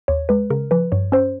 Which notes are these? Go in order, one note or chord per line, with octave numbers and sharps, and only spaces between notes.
D#2 C#5
G#3 B4
C#3 A#4
F3 B4
G2 C#5
C#4 C5